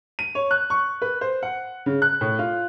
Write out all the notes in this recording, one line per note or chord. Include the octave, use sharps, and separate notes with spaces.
D#7
C#5
F#6
C#6
B4
C5
F#5
C#3
F#6
A2
F4